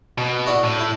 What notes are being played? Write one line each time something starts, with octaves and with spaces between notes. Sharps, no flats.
B2
D4 E4 F#4
A2
E4